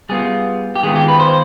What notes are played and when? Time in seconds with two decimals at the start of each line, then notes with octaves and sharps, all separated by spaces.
0.09 G3 B3 F4 G#4
0.76 G4
0.83 D#3 G#3 B3 F4 G#4
0.96 G4
1.08 B4
1.20 C5